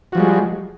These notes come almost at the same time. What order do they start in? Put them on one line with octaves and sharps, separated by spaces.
F#4 F3 G3 G#3